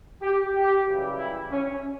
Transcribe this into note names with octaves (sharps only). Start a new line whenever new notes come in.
G4
G4
F#2 C#3 E3 G3
E4
C#4